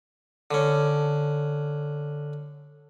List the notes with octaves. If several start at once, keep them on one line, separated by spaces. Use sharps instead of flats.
D3 C#4